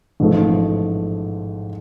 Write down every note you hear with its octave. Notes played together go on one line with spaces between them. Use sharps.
A1 G#2 F3 A3